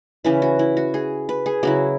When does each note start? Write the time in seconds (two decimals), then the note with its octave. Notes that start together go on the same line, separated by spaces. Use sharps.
0.24 C#3 E3 C#4 E4 B4
0.42 F#4
0.59 E4
0.77 F#4
0.94 G#4
1.29 B4
1.46 G#4
1.63 C#3 F#3 E4 F#4